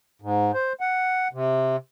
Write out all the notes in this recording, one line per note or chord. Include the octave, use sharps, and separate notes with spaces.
G#2
C5
F#5
C3